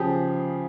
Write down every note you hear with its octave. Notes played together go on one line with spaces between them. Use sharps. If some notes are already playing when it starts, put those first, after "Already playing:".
Already playing: C#3 F3 G4 G#4